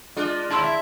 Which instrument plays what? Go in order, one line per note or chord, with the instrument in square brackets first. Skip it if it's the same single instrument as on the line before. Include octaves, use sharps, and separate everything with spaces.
[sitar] G#3 D4 F4
[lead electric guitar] D#2 [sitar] E4 [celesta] A5 C6 E6
[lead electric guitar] E5